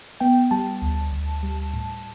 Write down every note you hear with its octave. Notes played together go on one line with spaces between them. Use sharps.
B3 G5
G3 A5
D2
D2
G3
A2